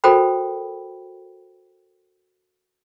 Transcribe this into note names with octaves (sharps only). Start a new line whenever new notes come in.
F#4 A4 A#4 C5 G5 B5